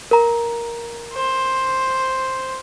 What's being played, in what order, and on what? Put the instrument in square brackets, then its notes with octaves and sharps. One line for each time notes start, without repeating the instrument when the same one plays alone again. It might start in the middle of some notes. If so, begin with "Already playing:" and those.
[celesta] A#4 A#5
[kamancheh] C5